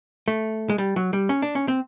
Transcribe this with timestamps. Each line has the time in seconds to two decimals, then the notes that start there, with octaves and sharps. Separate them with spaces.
0.28 A3
0.70 G#3
0.78 G3
0.96 F#3
1.13 G3
1.29 C#4
1.42 D4
1.55 C#4
1.68 C4